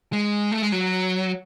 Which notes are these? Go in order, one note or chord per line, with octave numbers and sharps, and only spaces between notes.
G#3
A3
G#3
F#3